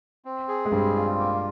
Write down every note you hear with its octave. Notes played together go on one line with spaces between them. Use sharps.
C4
G#4
G#3
G2 G3 C4
F4
A#3